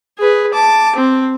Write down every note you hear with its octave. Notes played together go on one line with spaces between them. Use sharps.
G#4 B4
A5 D6
C4